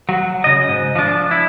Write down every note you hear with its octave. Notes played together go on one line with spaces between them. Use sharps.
F#3
C#3 D#5
G#2
F3 D4
E4